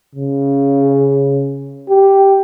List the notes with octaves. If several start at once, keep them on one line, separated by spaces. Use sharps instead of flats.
C#3
G4